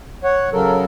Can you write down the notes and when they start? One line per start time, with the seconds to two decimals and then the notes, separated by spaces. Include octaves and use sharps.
0.24 C#5 F#5
0.53 C#3 F#3 A4 A#4